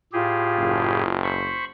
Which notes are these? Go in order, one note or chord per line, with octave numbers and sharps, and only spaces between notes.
A2 F4 G4 G#4
F#1
C5 B5 C#6